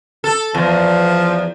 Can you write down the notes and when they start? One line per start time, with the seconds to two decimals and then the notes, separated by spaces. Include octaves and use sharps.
0.24 A4
0.55 E2 F3